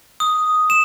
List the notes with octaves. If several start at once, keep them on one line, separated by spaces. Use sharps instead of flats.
D#6
E7